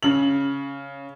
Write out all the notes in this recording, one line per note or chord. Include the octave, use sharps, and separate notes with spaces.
C#3 F#7